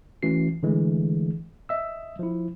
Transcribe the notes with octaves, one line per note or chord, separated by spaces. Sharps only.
E3 A3 C#4 F#4 C7
D3 E3 G#3 A3
D#5 E5 E6
F3 E4